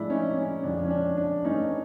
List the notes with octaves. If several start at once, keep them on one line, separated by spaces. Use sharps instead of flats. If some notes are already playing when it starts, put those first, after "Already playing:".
Already playing: A2 F3 G#3 D4 E4
C#4 D#4
C#4
F2 C#3 F3 G#3 D4
C#4
D4
D4
G2 E3 A3 C#4 D#4